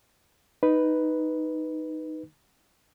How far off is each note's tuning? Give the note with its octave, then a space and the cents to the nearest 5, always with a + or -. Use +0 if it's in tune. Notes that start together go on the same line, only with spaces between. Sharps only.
D#4 +0 B4 +0